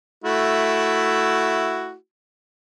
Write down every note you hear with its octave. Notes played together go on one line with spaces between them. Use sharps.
A3 E4 F#4